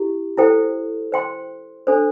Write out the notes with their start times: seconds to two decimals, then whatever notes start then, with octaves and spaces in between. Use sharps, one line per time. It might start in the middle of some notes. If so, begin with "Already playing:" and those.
Already playing: E4 G4
0.37 E4 A4 C5 G5
1.12 C5 G5 C6
1.87 D4 A4 C5